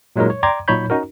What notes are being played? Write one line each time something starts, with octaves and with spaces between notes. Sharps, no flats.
A#2 F#3 G#3 D#4 A#4
C#5
D5 G5 A#5 C6 D6 G#6
A#2 F#3 D#4 C#5 B5 G6
C#4 D#4 F#4 A#4